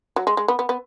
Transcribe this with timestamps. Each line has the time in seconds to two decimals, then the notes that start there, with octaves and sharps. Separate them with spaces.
0.16 F#3
0.27 G#3
0.37 G#3
0.48 B3
0.59 B3
0.69 B3